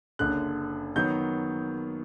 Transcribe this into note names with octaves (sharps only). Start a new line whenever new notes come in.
F#1 F#2 D3 F#6
D#3 F#3 B3 G6